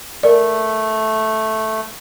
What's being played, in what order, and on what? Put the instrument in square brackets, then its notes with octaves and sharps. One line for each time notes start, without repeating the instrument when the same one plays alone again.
[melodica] A3 [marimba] A#4 D5